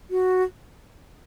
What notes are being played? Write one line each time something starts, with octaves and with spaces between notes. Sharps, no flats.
F#4